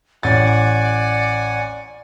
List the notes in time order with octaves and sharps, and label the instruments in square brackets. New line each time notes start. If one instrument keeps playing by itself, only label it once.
[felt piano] A1 A6 [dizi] D5 [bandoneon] F#5 G#5